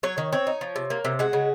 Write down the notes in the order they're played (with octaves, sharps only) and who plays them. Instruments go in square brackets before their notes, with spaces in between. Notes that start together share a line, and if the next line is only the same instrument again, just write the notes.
[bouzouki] F#3 C#5
D#3
C4 C#5
D#4
F3
C3
A#3
C3
G#3 F#4
C#3